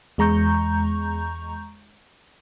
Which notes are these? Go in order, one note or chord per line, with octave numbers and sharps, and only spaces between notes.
E2 G#3 A#5 C#6 G6